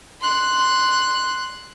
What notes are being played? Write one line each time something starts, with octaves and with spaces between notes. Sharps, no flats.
C6 F#6